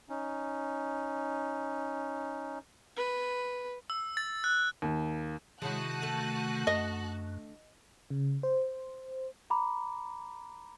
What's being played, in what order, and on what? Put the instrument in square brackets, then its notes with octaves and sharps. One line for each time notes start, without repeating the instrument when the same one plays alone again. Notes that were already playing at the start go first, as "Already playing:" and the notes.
[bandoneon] C#4 D#4
[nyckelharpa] B4
[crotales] E6
A6
F#6
[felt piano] D#2
[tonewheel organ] C3 D#3 [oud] G#3 C#4 E4 [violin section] F#4 A5 F#6
[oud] D2 A3 A4
[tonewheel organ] F#2 [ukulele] D#5
[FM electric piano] C#3
C5
[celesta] A#5 B5 D6